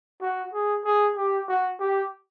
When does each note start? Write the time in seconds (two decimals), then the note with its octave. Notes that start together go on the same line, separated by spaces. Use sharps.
0.21 F#4
0.53 G#4
0.85 G#4
1.16 G4
1.48 F#4
1.80 G4